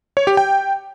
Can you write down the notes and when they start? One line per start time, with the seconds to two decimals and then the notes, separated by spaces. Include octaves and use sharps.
0.17 C#5
0.27 G4
0.37 G5